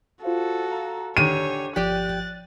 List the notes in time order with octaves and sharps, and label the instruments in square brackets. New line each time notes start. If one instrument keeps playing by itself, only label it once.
[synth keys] F4 C5 F5 [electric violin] F#4 A4
[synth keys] F5 A#5
[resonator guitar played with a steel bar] D3 D#3 G4 [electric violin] C#5 [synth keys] G#5 [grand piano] D#7
[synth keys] G1 F3 G5 [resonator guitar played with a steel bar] G4 D5 [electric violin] F#6 A6